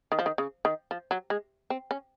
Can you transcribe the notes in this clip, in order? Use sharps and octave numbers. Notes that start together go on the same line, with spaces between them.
D#3
F3
D#3
C#3
D#3
F3
F#3
G#3
C4
C#4